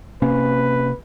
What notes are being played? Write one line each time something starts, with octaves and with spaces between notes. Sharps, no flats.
C3 A#3 C#4 B4